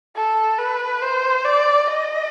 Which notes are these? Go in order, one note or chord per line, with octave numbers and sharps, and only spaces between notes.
A4
B4
C5
D5
D#5